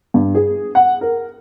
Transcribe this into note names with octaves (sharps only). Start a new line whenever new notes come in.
G2
G#4
F#5
A#4